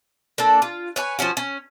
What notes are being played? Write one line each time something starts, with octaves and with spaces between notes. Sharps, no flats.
A#3 D4 A4
F4
B4 C#5 G#5
F3 G3 C#4 F#4
C#4